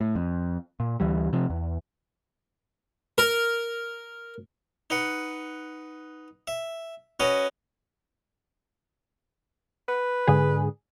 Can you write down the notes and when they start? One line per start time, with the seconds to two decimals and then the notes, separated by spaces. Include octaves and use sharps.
0.01 A2
0.15 F2
0.80 A#2
1.00 D2 E3 G3
1.33 C3 F3
1.50 E2
3.18 A#4
4.90 D#4 B4 F#5
6.47 E5
7.20 C#4 F#4 B4 D#5
9.88 B4
10.27 G#2 D3 G#4